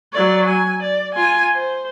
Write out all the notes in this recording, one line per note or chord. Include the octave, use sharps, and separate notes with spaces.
F#3 D5
G#5
D5
F4 G#5
C5